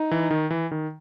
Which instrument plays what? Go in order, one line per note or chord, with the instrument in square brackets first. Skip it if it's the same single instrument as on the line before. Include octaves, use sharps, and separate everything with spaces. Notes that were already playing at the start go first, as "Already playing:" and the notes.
Already playing: [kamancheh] D#4
[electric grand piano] E3
D#3
E3
D#3